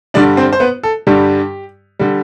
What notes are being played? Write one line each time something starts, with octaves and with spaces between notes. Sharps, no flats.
G2 D3 G3 D4 D5
C4 C5
C5
B3 B4
A4
G2 D3 G3 G4
D3 G3